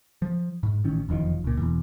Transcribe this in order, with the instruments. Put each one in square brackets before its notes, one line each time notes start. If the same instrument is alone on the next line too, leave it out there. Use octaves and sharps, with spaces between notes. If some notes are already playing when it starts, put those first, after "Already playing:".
[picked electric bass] F3
G#2
A1 D#3 C#4
F1 E2 D#3 F3
C#2 A#2
E1 A#1 E2